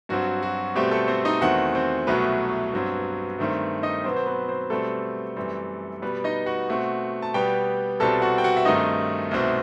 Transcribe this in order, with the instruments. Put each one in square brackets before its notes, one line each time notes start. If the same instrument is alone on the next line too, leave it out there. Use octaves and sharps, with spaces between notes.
[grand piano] G2 F#3 C4 F#4
F#4
B2 G3 A3 C4 G4
A3 A4
C4 C5
D#4 D#5
E2 D#3 A3 C4 F#4 F#5
C4 C5
C2 B2 F#3 A3 B3 B4
G2 F#3 C4
G2 D#3 A3 C4
D#4 D#5
B2 F#3 B3 C4 C5
C5
B3 B4
C4 C5
B2 G3 A3 C4 A4
F#2 E3 G3 C4
B2 G3 B3 B4
D#4 D#5
F#4 F#5
B2 A3 C4
A5
B2 G3 B3 G4 G5
C2 B2 G3 C4 A4 A5
F#4 F#5
G5
F#4 F#5
E5
G2 D#3 A3 C4 D#4 D#5
C2 B2 A3 C4